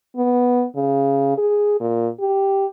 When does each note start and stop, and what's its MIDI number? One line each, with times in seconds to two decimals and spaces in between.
0.17 0.65 59
0.76 1.34 49
1.38 1.76 68
1.80 2.08 46
2.20 2.66 67